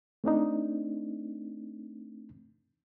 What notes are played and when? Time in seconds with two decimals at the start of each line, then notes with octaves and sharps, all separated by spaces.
0.24 A3 C4 D4 D#4